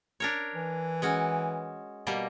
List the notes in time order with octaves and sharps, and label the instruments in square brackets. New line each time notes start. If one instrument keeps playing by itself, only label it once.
[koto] D4 A#4 C#5
[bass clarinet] E3
[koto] G#3 C#4 F#4
B2 G3 A#3